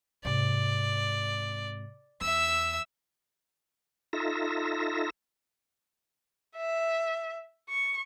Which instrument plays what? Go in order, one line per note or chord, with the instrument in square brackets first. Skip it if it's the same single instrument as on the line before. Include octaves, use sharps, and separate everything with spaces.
[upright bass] G#2 C3 [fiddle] D5
[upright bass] E2 [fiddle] E5 E6
[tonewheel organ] D#4 F4 A4 E5 A#6
[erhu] E5
C#6